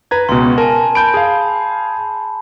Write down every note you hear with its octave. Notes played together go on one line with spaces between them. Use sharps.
B4 A#5 G#6
C#2 B2 C6
A#4 G#5 A5
A5 B5 G6 D7
G#4 F5